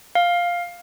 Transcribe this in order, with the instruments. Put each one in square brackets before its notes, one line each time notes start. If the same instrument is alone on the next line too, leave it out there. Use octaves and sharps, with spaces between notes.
[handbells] F5